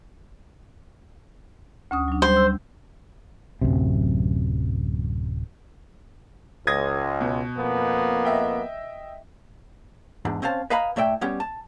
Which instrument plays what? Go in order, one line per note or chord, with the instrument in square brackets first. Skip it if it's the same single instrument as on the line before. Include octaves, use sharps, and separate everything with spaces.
[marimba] D2 C#4 D#6
F#3 D4
[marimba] G3 [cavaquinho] C5
[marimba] E6
[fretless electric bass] D1 G1 F#2 C3
[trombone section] C#2 [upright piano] D#6 G#6 A#6
[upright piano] B2
[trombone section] F2 A#3 B3
[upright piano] D#5 E5 G5
[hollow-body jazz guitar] E2 G#2 D4
C4 C#4 C5 F5 A5
B4 D#5 F5 G#5 A#5 B5
A2 A3 D5 E5 G5
G3 B3 C#4 G4
A5